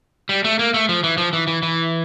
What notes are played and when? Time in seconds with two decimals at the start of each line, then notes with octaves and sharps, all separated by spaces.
0.29 G3
0.44 A3
0.59 A#3
0.74 A3
0.89 F3
1.04 E3
1.18 F3
1.33 E3
1.47 E3
1.63 E3